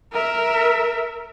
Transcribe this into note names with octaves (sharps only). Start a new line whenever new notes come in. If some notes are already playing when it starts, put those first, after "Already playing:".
A#4 E5